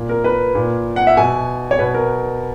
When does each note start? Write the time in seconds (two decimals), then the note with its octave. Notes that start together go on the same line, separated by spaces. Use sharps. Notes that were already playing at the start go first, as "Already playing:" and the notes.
Already playing: A#2
0.09 A#4
0.24 B4
0.55 A#2
0.96 F#5
1.07 E5
1.17 B2 G#5
1.71 C#5
1.79 B2 B4
1.94 A#4